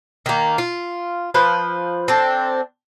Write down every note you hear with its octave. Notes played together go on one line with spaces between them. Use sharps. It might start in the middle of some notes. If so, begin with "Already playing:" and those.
D#3 A#3
F4
F3 B4 C5
C4 D4 A4